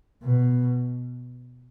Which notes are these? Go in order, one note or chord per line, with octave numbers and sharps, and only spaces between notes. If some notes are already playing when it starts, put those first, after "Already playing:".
B2